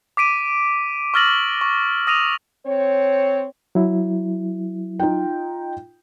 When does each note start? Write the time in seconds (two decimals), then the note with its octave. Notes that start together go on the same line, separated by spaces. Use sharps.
0.17 D6 B6 D7 D#7
1.14 C#6 E6 F6 A6 A#6 F#7
1.61 C#6
2.07 D#6 A#6 D#7 F7
2.66 C4 C#5
3.75 F#3 E4
5.00 D#4 F4 G5